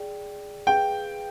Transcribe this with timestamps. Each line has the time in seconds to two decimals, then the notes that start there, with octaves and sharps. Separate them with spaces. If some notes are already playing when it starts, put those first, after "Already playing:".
Already playing: G#4 D5 G5
0.66 G#4 B4 F5 G5